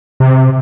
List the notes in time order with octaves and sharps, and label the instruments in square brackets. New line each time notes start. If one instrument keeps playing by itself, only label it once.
[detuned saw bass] C3